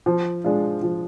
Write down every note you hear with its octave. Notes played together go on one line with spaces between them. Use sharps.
F3
G#3 D4 F4
F3